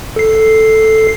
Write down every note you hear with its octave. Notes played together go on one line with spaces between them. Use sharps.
A4 C7